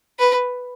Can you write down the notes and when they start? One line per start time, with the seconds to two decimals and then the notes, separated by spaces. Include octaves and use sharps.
0.19 B4